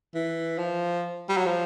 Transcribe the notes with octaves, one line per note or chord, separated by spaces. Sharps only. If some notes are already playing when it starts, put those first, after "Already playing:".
E3
F3
G3
F#3
F3